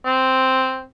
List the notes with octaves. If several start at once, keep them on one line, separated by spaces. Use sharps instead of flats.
C4